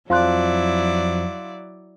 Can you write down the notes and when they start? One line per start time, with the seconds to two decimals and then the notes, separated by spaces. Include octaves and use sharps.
0.10 F2 F3 F#3 E4 D5 F5 C6 F#6